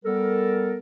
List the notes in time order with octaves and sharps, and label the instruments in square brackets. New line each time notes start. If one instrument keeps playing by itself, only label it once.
[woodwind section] G3 B3 A4 A#4